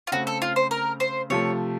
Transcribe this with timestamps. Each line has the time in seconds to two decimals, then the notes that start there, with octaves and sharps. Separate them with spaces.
0.07 F4
0.12 C#3 A3 C4 F#4
0.27 A4
0.42 F4
0.56 C5
0.71 A#4
1.00 C5
1.30 C3 F3 A3 C#5